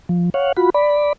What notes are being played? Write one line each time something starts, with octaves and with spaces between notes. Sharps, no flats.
F3
C#5 F5 F#5
F4 F#4 B5
D5 B5